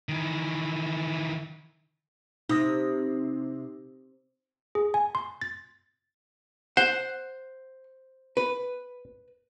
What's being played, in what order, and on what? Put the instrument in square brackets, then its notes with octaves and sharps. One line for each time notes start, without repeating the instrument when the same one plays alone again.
[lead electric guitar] D#3 E3
[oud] C3 [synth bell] D#4 D#6 A#6
[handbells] G#4
G#5
C6
A6
[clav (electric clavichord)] C5 [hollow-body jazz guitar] F#5
[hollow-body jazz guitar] B4